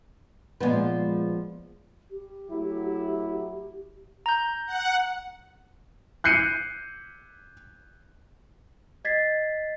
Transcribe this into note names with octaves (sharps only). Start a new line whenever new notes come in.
A#2 F3 G#3 B3 B4
G4
F#3 A3 E4
A#5 G6
F#5
F#6 G6 C7 C#7 D#7
D#5 G#6 A6 B6 C7